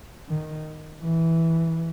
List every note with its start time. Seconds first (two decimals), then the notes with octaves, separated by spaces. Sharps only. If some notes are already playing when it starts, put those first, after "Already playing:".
0.29 D#3
1.04 E3